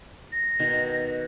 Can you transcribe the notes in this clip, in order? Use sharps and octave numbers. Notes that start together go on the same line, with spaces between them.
A#6
B2 D#3